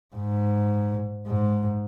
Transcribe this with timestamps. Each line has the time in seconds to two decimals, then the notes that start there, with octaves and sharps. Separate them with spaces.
0.15 G#2
1.27 G#2